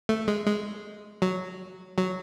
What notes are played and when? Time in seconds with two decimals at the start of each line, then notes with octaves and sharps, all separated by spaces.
0.09 A3
0.28 G#3
0.47 G#3
1.22 F#3
1.98 F#3